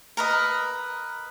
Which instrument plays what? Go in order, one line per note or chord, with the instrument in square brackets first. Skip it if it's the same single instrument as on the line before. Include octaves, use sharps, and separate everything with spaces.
[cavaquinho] A#4 B4 D#5